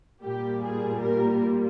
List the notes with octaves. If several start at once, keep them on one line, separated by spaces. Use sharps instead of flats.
A#2 G3 A#3 G4
G#4
A#4